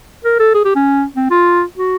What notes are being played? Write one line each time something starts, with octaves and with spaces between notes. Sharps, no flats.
A#4
A4
G#4
G4
C#4
C4
F4
F#4